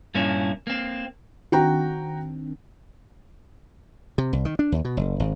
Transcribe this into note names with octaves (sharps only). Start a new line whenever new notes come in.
G2 A#2 A#3 C#4 E4
A#3 C4
D#3 C4 D4 F#4 G5 A#5
C3
C2
D#3
D4
D#2
B2
F#1
G#1